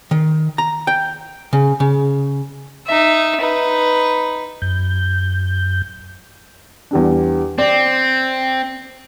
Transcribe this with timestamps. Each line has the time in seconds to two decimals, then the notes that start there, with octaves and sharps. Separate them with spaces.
0.11 D#3
0.58 A#5
0.87 G5
1.53 C#3
1.80 C#3
2.87 D#4 E5
3.41 D#4 B4
4.62 F#2 G6
6.91 E2 G3 D4
7.58 C4 D5